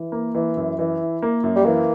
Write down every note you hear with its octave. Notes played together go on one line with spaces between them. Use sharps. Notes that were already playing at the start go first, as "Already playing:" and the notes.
Already playing: E3
A#3
E3
F#2
E3
E4
A#3
F#2
G3
E3 A#3